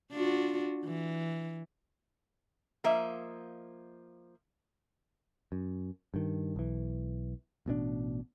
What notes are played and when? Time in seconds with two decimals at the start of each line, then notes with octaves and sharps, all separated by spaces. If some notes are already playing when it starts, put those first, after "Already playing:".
0.11 D4 F4 F#4
0.84 E3
2.84 F3 A#3 D#5 E5
5.52 F#2
6.14 G2 D#3
6.56 B1 E3
7.66 A1 B2 D#3 D4